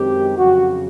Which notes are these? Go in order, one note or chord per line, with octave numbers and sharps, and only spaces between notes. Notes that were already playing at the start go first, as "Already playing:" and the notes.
Already playing: F#2 D#3 G#3 C4 G4
F2 C#3 F#3 F#4